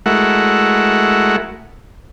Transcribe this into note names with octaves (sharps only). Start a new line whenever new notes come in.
G#3 A3 E4 F#4 A#4 F#5